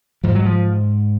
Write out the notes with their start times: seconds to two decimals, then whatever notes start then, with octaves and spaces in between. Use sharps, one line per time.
0.24 G#2 F3
0.35 F#3
0.45 F3